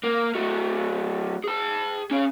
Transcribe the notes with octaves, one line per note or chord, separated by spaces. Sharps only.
A#3
F#3 A3
G#4 A5
C#4 G#4